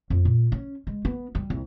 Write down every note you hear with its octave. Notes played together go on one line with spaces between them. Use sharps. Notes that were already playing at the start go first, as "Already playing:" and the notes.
F2
A#2
C#4
G#3
B3
G3
C2